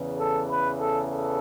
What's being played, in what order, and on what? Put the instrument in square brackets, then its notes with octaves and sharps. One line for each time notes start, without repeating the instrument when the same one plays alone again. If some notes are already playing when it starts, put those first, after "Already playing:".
Already playing: [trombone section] E2 C#3 E3
A4
B4
A4
A4